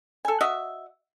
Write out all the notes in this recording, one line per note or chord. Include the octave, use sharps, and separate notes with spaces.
A4 G#5
F#4 D#5 E5